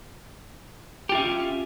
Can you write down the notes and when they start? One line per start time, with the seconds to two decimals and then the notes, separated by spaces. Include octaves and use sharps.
1.09 G4
1.12 F4
1.15 E5
1.18 C#4